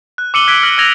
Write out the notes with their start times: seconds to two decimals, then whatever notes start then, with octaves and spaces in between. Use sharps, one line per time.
0.18 F#6
0.34 D6 E6 C#7 D#7 F#7 G7
0.47 E6 F#6 G#6 B6 D7 G7
0.63 F6 A#6 F#7
0.78 E6 F6 G#6 A#6 F7